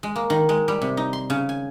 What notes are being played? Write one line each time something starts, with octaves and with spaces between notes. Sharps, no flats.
G#3
A#3
D#3
G#3
G3
C3
D#4
C6
C#3
G#5